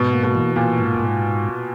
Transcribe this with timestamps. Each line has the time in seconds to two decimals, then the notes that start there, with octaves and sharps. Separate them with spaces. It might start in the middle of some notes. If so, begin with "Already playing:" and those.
Already playing: G#2 B2
0.13 A#3
0.23 B2
0.35 E3
0.56 A#2 A#3
0.78 G#2
1.00 G#2